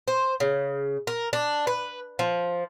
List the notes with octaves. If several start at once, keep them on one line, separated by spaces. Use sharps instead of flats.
C5
C#3
A#4
D4
B4
F3